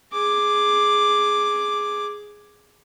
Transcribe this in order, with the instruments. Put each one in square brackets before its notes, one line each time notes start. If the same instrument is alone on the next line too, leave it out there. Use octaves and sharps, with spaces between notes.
[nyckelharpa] G#4 D6